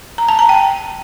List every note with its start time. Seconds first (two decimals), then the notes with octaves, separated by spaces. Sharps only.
0.18 A#5
0.28 A5
0.39 A#5
0.49 G5